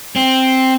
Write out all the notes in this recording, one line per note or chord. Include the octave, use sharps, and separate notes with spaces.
C4